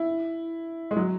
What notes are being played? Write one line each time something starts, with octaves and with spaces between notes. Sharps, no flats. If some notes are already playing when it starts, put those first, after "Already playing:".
Already playing: E4
G#3
F#3